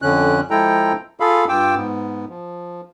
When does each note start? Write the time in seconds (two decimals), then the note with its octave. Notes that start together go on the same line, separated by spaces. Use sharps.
0.02 F2 D3 C#4 F#6
0.50 F3 G#3 E4 A4 G5 A#5
1.20 F4 G#4 A4 F5 B5
1.49 G2 F4 G5 D6 E6
1.75 G#2 B3
2.29 F3